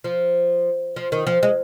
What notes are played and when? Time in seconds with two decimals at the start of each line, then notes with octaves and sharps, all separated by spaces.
0.04 F3
0.96 F3
1.12 D#3
1.27 F3
1.43 G#3